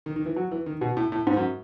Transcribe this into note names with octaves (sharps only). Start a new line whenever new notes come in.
D#3
D#3
E3
F#3
E3
D#3
B2
A2
A2
G#2
F#2